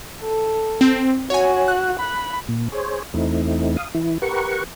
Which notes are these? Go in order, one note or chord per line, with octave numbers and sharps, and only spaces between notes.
A4
C4
F#4 C#5 G#5
F#6
B5
A#2
G#4 C5 C#5
E2 A3 C4 D#4 E4
F5 D#6
E3 E4
G4 A#4 B4 F#5 C#6